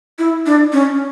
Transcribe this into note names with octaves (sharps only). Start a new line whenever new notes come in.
E4
D4
C#4